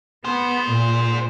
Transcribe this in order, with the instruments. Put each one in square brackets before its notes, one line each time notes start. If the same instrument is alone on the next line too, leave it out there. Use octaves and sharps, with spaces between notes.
[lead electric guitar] G#3 C5 [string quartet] B3
[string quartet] A#2